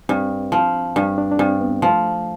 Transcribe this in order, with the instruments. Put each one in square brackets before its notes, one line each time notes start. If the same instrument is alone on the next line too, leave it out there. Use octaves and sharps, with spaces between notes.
[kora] G2 [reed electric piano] C4
[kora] F3
[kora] G2 [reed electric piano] D4
[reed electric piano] D4
D4
[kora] G2 [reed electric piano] C4
[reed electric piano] B3
[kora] F3 [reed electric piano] A3